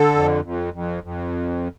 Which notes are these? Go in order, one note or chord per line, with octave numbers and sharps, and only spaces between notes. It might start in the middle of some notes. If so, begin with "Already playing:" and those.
Already playing: D3 A4
F2
F2
F2
F2